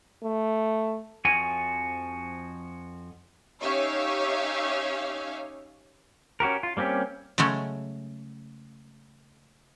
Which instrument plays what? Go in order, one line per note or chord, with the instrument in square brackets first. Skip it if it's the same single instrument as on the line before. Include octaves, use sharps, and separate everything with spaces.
[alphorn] A3
[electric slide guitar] F2 F3 F#4 G#5
[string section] C#4 D#4 G4 C#5 E5 F5
[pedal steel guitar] C#4 F#4 G4 A#4
F4
G3 A#3 C4 C#4 G4
[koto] C#3 F#3 G#3 A3 C#4